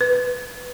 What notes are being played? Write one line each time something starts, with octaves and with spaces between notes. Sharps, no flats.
B4